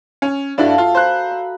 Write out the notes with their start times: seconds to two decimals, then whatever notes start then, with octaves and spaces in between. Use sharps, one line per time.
0.22 C#4
0.58 G2 A3 D4 E4 F#4 F5
0.78 F4
0.95 A#4 C5 A#5 B5 F#6
1.31 E6